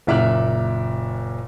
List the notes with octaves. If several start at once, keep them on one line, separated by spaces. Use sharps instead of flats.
F#1 A#2 E5 D6 F6 F#6